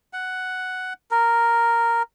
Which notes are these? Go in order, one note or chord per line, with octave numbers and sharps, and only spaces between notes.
F#5
A#4